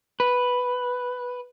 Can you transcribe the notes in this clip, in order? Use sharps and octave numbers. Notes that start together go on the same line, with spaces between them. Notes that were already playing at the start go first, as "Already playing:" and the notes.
B4